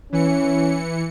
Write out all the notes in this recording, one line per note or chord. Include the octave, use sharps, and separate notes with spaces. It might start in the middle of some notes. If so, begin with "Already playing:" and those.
E3 C#4 C#7